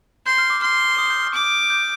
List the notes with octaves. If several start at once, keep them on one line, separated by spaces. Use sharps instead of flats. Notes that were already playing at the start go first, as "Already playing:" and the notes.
C6 G6
F6
D6
C6 F6
D#6
G6
F6
D6
G6